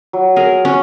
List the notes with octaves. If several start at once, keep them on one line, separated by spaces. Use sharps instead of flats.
F#3
G#4 A#4
C#4